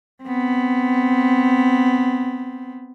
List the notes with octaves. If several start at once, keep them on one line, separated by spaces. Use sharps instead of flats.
B3 C4